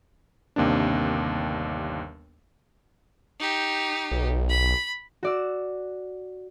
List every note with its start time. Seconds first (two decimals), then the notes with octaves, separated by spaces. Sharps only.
0.56 G1 D#2 C3 A#3 D4
3.40 D#4 G4
4.11 B1
4.49 B5
5.23 F#4 D5 E6